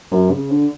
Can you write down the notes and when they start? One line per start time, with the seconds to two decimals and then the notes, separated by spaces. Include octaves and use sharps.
0.11 F#2
0.31 C#3
0.51 D3